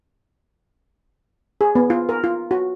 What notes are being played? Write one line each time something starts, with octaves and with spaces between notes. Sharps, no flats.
G#4
B3
F4
A#4
F4
F#4